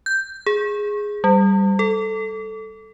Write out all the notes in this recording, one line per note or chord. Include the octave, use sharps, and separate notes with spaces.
G6
G#4
G3
A4